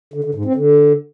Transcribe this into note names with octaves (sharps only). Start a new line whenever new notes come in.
D3
D3
G#2
C4
D3